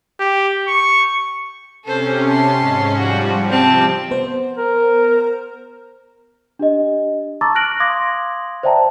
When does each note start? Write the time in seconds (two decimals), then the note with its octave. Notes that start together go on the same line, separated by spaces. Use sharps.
0.20 G4
0.67 C#6
1.85 C3 C#4 A4 C5
2.28 A5 C6
2.58 G#2 C#4
2.96 F3 G3 F#4
3.49 C3 F3 C4 A5
4.11 B3 C5
4.58 A#4
6.59 D4 G4 D#5
7.41 A5 A#5 C#6 D6 E6 A6
7.55 F6 F#6 A#6 D7 F#7
7.80 F5 C6 D6 D#6 G#6 A#6
8.63 C5 D5 E5 G5 A5 A#5